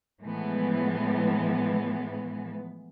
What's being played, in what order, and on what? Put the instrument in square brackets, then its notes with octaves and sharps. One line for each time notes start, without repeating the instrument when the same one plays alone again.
[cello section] A2 E3 F3 G#3 B3